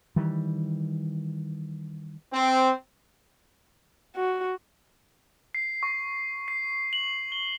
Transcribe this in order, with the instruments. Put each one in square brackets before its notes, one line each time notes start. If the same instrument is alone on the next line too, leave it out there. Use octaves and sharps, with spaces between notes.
[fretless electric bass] D#3 E3 G3
[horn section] C4
[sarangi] F#4
[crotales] C7
C#6
C7
F#7
G7